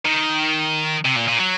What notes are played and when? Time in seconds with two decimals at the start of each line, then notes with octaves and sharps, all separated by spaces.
0.05 D#3
1.06 C3
1.16 A#2
1.28 A#2
1.39 F#3